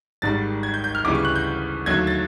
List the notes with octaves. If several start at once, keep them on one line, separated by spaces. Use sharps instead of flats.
G#1 G#2 D#3 G3 A6
G#6
G6
G6
F6
D2 C#3 E3 G3 D6
C#6
F#6
G6
D#2 D3 F#3 A3 G#6
A6